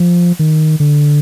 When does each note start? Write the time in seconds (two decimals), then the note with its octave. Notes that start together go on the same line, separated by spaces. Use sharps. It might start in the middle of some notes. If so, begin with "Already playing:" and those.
Already playing: F3
0.39 D#3
0.80 D3